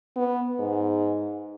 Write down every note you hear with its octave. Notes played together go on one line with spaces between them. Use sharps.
B3
G#2